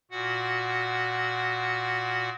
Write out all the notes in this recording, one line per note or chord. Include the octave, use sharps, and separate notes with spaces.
A#2 F#4 F#5